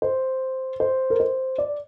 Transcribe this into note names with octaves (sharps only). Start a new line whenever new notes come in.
C5
C5
A#4
C5
D5